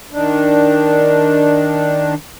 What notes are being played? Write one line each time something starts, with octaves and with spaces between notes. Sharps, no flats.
D#3 D4